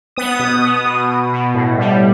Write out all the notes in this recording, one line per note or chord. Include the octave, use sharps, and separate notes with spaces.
B3 D#6
B2
B3
B2
B2
B2
A2
G3